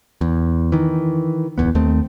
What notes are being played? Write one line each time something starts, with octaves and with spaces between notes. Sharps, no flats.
E2
D#3 E3
D1 E2 B3
D#2 D#3 A3 C4